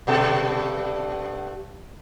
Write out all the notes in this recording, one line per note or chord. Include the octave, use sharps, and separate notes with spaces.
G2 B2 A4